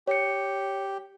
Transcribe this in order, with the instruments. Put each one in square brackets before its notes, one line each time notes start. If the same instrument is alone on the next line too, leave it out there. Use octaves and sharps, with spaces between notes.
[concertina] G4 [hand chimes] C#5 C#7